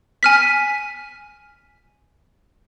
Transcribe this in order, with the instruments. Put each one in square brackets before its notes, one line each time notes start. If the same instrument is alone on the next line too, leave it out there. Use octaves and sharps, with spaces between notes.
[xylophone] G#5 F6 B6